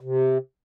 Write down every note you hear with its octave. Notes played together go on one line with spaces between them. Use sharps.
C3